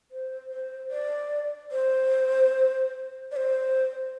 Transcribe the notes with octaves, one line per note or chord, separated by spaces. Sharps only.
C5
C5
D5
C5
D5
C5